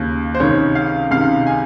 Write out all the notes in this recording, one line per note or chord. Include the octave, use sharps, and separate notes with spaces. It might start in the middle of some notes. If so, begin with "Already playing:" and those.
Already playing: D#2 C#3
C5
C#2 C3 D#3 C#5
F5
C#2 C3 D#3 F5
G#5